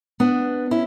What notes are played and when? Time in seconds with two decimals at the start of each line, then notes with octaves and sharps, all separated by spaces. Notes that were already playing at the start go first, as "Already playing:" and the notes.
0.20 B3 D4
0.71 C#4 E4